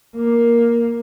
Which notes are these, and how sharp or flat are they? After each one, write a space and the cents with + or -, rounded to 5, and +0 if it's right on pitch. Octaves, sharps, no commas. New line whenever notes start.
A#3 +5